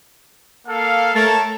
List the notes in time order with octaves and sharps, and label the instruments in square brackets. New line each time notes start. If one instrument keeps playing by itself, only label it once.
[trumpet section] A#3 A4 F5
[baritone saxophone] A3 [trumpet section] A#4 C#5 A5